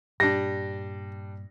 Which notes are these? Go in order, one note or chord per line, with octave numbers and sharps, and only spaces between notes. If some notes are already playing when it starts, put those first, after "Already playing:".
G2 A#2 G3 D4 A#6